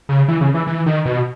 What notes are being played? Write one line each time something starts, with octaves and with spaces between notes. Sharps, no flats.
C#3
E3
C#3
E3
E3
D#3
B2